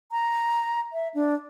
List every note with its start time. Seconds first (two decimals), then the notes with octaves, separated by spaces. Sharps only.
0.12 A#5
0.93 E5
1.14 D4